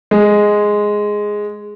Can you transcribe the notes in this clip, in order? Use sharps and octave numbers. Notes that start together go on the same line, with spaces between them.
G#3